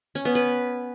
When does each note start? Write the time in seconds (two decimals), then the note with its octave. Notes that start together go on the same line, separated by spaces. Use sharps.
0.15 C#4
0.25 B3
0.35 B4